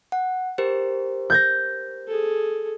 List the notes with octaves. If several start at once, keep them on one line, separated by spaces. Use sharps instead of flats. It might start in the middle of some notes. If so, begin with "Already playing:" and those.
F#5
G4 A#4 C5
G6 G#6 A#6
G#4 A4